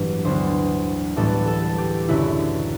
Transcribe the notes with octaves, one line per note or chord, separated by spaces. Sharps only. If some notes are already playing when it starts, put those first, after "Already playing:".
Already playing: A1 G2 F#3 B3
D2 D3 F#3 B3 C5
A1 A2 G3 B3 A4
A4
G4
F#1 F#2 D3 E4